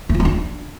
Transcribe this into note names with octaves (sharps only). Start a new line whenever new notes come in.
A3
F4
G#3
D4